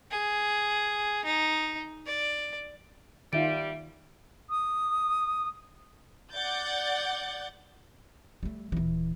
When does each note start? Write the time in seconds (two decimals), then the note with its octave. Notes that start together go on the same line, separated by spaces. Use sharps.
0.11 G#4
1.25 D#4
2.06 D5
3.33 D#3 G3 F4 E5 D7
4.50 D#6
6.33 D5 F#5 G6 A6
8.43 G3 A3
8.72 D#1 E3